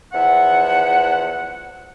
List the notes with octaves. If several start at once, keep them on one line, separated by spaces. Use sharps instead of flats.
E2 F3 E5 F#5